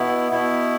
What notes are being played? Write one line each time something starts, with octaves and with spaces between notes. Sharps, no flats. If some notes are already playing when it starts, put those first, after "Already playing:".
Already playing: B2 B3 E4
B2 B3 E4